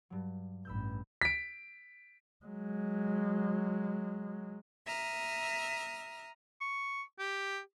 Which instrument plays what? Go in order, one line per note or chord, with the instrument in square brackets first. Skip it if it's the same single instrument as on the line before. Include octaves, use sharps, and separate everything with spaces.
[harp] G2 F#3
[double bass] A1 G2 [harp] B5 E6 G6
[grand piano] B6 D7
[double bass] F#3 G#3
[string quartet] E5 A#5 D#6 F6
[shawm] C#6
G4